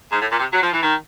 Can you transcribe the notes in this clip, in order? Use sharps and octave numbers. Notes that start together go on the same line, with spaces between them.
G#2
A2
A#2
C3
F#3
F3
E3
D#3